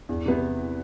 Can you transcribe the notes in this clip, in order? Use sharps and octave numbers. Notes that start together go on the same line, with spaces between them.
E2
C3 E3 B3 E4